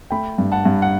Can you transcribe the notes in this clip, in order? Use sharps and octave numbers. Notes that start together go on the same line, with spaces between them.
A3 G5 B5
G2
F#5 A5
G2
F#5